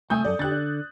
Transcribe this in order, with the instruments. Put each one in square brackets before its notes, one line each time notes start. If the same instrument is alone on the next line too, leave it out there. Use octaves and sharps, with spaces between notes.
[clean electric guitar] C2 A3 E5 [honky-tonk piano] G#5 D#6 G6
[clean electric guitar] C#2 F#2 [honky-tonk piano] A4 D5
[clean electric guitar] D3 [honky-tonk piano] G4 F#6 A6
[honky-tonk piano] D4